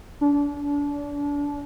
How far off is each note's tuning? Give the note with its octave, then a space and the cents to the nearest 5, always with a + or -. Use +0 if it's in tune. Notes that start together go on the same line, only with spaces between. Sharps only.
D4 -30